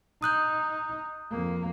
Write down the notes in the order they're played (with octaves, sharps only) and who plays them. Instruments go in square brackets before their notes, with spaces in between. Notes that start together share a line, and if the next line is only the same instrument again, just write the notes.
[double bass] D#4 [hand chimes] D#6 F#6 G6
[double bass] F2 A#3